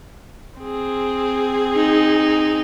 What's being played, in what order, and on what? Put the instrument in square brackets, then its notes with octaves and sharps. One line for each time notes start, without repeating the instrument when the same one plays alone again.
[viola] C4 G#4
[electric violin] D#4